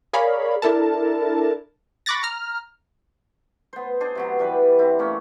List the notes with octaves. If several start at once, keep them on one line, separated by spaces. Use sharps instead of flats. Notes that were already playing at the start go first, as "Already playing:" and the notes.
G#4 A#4 C#5 D5 F5 B5
D4 E4 A4 A#4 A5
B5 C#6 D6 F#6 A6 A#6
A#5 F6
B3 C5
D4 G#4 C5
C3 F#3 B3
E3 G3 B4
C4 E4
A3 A#3 C#4